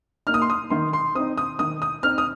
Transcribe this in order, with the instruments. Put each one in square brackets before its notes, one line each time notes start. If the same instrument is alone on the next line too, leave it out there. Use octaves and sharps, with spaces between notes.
[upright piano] A#3 D#4 F6
D#6
C6
D#6
D#3 C6
C6
C4 D#4 D#6
D#6
D#3 D#6
D#6
C4 D#4 F6
D#6